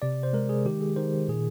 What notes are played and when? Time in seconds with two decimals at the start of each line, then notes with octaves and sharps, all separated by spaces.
0.02 C3 D5
0.23 C5
0.33 G#3 A#4
0.49 G#4
0.65 D#3 G4
0.81 G#4
0.96 D#3 C5
1.28 A#2 G#4